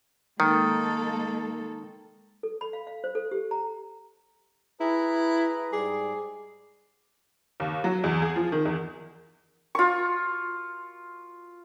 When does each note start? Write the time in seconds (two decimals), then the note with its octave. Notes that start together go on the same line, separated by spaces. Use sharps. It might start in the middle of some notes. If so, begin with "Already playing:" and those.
0.40 D#3 G#3 A#3 A4
2.43 A4
2.61 B5
2.73 F5
2.87 F5
3.04 C5
3.15 A4
3.31 G4
3.51 A#5
4.80 E4 G#4 B4 A#5
5.73 G#2 G3 G#4 D6
7.60 D#2
7.84 F#3
8.04 E2
8.22 G#4
8.36 F3
8.52 D#3
8.65 E2
9.75 F4 C#6